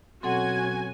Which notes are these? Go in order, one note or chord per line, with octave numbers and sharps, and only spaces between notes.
B2 F#3 C4 C#4 F#4 A4 F#5 G#5